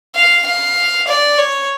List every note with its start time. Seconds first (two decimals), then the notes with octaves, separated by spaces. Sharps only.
0.15 F5
0.46 F5
1.08 D5
1.38 C#5